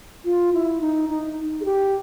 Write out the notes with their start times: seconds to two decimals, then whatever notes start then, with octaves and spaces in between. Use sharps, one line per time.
0.25 F4
0.53 E4
0.81 D#4
1.09 D#4
1.61 G#4
1.65 G4